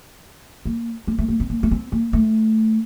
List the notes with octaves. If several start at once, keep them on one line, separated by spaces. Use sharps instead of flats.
A#3
A#3
A3
A#3
C4
A#3
A#3
C4
A#3
A3